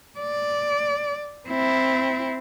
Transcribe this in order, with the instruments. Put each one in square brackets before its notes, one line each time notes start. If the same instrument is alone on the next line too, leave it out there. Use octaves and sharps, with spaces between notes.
[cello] D5
C4 E4